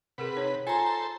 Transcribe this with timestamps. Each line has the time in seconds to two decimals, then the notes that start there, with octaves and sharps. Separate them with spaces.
0.18 C3 G#4 A#4 B4 F#5
0.36 D#4 C#5
0.67 F4 A4 C5 G#5 A#5
0.86 A#5